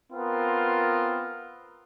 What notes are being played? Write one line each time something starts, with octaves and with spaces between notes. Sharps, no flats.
B3 C4 F4 A#4